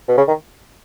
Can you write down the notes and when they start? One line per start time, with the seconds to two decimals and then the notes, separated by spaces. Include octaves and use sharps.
0.09 B2
0.18 C#3
0.28 D#3